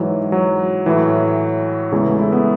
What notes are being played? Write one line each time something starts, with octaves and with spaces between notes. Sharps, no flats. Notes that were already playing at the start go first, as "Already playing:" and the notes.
Already playing: G#2 E3 F#3
F#3
A2 E3
E2 C#3 E3 G#3
A3
E4
B3